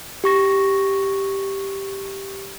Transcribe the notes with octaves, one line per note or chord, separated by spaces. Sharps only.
G4 C#6 A#6